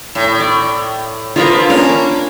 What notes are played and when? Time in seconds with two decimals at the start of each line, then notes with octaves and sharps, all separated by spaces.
0.15 A2
0.40 D5
1.36 D3 F3 F4 A#4 B4
1.70 A#3 C#4 D4 A#4